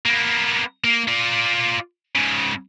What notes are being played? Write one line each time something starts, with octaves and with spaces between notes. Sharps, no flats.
A#3 B3
A#3
F4 D5
G#2 C#3